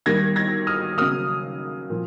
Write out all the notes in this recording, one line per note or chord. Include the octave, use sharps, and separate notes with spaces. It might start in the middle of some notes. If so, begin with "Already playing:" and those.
D#3 G3 A#3 G#6 A#6
G#6 A#6
D#6 F6
C#3 F#3 A#3 D#6 F6
A#2 F3